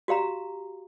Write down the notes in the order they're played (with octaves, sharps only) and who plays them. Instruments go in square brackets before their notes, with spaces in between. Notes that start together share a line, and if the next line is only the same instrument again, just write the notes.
[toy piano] F#4 G4 F5 A#5